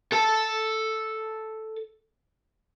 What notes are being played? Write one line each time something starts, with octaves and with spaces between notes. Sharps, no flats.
A4 A5